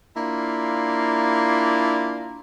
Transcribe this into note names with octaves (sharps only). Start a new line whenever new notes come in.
A#3 D4 E4 F4